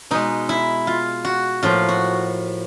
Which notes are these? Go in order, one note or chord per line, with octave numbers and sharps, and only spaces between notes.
B2 G#3 D#4
E4
F4
F#4
A2 F3 A#3 F4
F#4